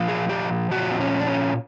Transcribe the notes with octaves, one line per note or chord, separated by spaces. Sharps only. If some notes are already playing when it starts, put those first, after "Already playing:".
Already playing: A#2 F3
G#4
G4
A#2 F3 F#4
C4
C#4
D4
C#4